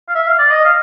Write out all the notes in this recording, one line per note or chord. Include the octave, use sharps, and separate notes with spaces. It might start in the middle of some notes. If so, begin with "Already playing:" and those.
F5
E5
F5
D5
D#5
F5